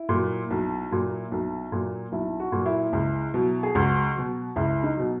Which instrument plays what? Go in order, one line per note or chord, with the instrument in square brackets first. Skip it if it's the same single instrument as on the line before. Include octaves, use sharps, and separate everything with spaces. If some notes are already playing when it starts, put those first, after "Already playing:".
Already playing: [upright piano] E4
A#2 F#3
B1
A#2 F#3
B1
A#2 F#3
B1 E4
F#4
A#2 F#3
E4
C#2
B2 F#3
G#4
C#2 F#4
B2 F#3
C#2 E4
D#4
B2 F#3